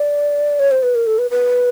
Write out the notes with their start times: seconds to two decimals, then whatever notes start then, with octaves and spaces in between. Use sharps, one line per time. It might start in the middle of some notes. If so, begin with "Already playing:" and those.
Already playing: D5
0.59 C#5
0.71 C5
0.83 B4
0.95 A#4
1.07 A4
1.19 B4
1.31 B4